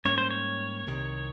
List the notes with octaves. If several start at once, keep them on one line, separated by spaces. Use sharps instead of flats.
G#2 G3 A#3 C#4 C#5
C5
C#5
C2 C3 D#3